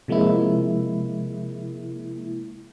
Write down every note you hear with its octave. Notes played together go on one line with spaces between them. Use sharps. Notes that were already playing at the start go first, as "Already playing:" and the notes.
C3 F3 G#3 A#3 E4